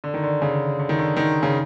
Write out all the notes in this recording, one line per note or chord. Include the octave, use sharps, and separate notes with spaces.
D3
D#3
D3
C#3
D3
D#3
D3
D#3
C#3